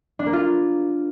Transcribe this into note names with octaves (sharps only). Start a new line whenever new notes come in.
D4
A#3
F4